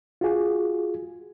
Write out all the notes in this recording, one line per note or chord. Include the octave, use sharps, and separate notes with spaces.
F4 F#4 G#4